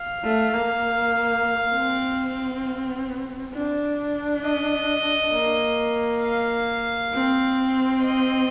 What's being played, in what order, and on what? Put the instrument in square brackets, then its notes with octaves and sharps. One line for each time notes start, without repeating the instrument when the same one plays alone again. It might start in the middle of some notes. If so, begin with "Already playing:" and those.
Already playing: [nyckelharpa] F5
[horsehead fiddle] A3
A#3
C4
D4
[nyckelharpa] D#5
[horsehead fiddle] A#3
[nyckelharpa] F5
[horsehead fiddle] C4
[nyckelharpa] D#5